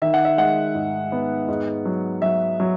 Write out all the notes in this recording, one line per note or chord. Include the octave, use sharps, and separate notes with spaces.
D#3 E5
F#5
E5
G#3 F#5
G#2
B3
G#2
F#3
F#3 E5
F#3